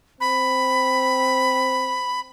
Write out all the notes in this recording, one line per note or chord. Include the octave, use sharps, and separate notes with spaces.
C4 B5